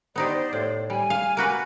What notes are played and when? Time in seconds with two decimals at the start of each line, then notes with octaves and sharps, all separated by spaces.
0.16 B3 D#4 G4 C5 D5
0.53 A2
0.90 G3 G#5
1.10 F5
1.37 A#3 F#4 B4